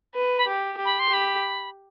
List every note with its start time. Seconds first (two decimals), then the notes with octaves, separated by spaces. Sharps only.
0.14 B4
0.38 B5
0.46 G4
0.77 G4
0.85 B5
0.99 C6
1.09 G4 B5